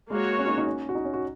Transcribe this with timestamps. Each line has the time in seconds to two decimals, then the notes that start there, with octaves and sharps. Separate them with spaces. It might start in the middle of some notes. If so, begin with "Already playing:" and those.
0.10 G#3 A#3 F#4 C#5
0.39 C#4
0.47 D#4
0.58 D#4
0.67 C#4
0.89 F#4
0.95 D#4
1.04 C#4
1.14 F#4